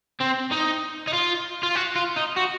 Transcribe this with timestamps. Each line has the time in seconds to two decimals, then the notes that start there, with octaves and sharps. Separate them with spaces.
0.21 C4
0.52 D#4
1.07 D#4
1.13 F4
1.63 F4
1.75 F#4
1.95 F4
2.16 D#4
2.36 F#4